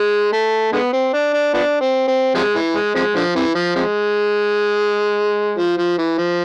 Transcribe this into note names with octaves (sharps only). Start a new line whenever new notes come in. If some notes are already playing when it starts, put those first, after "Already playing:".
Already playing: G#3
A3
D3 G#3 B3
C4
D4
D4
F3 B3 D4
C4
C4
C3 F3 G#3
E3
G#3
C3 F3 G#3
D3 F3
C3 E3
F3
C3 F3 G#3
F3
F3
E3
F3